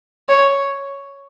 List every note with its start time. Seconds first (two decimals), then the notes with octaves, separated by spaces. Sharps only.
0.29 C#5